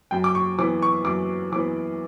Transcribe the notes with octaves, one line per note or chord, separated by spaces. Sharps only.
F#2 G5
D6
C#6
E3 B3 D6
C#6
F#2 D6
E3 B3 D6